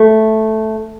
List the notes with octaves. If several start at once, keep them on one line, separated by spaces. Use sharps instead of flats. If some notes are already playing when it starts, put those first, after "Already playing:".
Already playing: A3